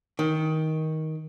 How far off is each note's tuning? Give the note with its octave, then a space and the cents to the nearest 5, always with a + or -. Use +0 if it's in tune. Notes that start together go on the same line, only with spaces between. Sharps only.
D#3 +15